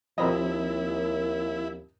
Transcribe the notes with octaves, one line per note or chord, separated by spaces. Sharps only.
D#2 F3 C4 E4 D#5 A#5 B5